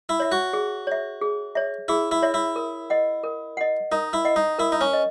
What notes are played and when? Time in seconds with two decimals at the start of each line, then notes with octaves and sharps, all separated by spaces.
0.09 E4
0.20 C#5 E5
0.32 F#4
0.53 G#4
0.87 C#5 E5
1.22 G#4
1.55 C#5 E5
1.88 E4 G#4
2.11 E4
2.22 C#5 E5
2.34 E4
2.56 A#4
2.90 D#5 F#5
3.24 A#4
3.57 D#5 F#5
3.92 D#4 A#4
4.13 E4
4.25 D#5 F#5
4.36 D#4
4.59 E4 A#4
4.72 D#4
4.81 C#4
4.93 D#5